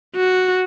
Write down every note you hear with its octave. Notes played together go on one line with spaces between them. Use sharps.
F#4